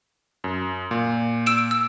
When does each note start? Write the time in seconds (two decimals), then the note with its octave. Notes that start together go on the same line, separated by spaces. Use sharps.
0.44 F#2
0.91 A#2
1.46 E6 D7 E7
1.71 E6